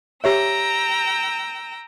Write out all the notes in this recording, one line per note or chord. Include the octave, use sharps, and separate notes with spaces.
G4 C#5 E5 G5 A#5 E6